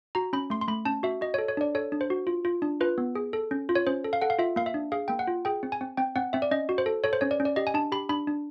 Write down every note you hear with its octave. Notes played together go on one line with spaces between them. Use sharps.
F#4 A#5
C#4 B5
A3 C6
C6
A3 B5
C#4 A5
F#4 E5
F#4 D#5
C#5
A4
C#5
D4 D5
A4 C#5
D4
C5
F#4
F4
F4
D4
F4 B4
B3
G#4
A4
C#4
F4
C#5
C#4 C5
A4
F5
A4 F#5
F5
F4 E5
A#3 F5
E5
D4
G#4 F5
A#3 G5
F#5
F4
G#4 G5
C4
G#5
C4
C4 G5
C4 F#5
C4 E5
D5
C#4 D#5
F#4
C5
A4
A4 C#5
C5
C#4 C#5
D5
C#4
D5
G4 D#5
G#5
D4 A5
G4 B5
D4 B5
D4